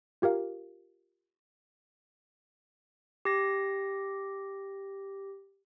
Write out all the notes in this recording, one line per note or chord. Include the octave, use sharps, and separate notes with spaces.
F4 G4 A#4 F5
G4 A#6